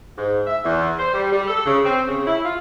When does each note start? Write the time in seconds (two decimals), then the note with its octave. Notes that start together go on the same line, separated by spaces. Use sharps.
0.18 G#2
0.47 E5
0.65 E2
1.00 C5
1.14 G3
1.32 G3
1.48 A4
1.66 C#3
1.85 C4
2.08 C#3
2.27 E4
2.45 F4